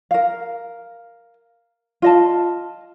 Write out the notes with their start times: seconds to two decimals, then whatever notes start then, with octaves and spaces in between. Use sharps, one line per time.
0.11 A#4 F5
2.02 F4 D#5 A5